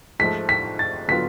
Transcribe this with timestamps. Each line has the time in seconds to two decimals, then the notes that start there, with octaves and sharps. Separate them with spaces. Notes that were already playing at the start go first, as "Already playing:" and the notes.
0.19 G#2 F3 A3 B6
0.49 B6
0.79 A6
1.08 D3 F#3 B3 F4 B6